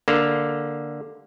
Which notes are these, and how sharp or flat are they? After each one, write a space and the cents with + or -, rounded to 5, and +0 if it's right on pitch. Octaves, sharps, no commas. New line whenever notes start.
D3 +0 A#3 +0